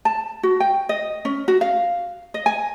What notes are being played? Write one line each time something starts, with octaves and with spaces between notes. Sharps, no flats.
A5
F#4
G5
D#5
C#4
F#4
F5
D#5
G#5